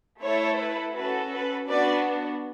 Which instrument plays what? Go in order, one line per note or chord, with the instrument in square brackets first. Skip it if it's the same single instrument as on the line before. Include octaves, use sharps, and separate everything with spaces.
[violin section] A3 E4 A4 C#5
B4
C#4 F#4 A4 B4
B4
B3 D4 F#4 B4 D5